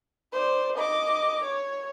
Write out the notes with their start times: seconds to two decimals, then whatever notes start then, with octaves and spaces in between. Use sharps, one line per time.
0.32 C5 D5
0.76 D#5 D6
1.44 C#5